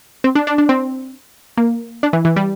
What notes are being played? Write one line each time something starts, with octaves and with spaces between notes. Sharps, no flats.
C4
D4
D4
D4
C4
A#3
D4
E3
E3
G3